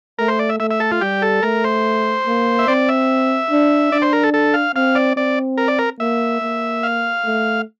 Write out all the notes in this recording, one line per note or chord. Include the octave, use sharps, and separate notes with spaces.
A3 A#4
C5
D5
E5
A3 E5
E5
A4
F4
G3 G4
A4
A3 A#4
C5
A#3
E5
C4 D5
E5
D4
D4 D5
C5
A#4
A4
A4
F5
C4 F5
D5
C4 D5
A#4
D5
A#4
A#3 E5
A#3
F5
A3